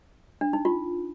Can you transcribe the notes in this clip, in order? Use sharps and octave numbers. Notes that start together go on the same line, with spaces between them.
D4
D#4
F4